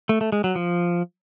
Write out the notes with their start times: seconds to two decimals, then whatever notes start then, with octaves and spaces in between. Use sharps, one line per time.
0.09 A3
0.21 A3
0.32 G#3
0.44 F#3
0.55 F3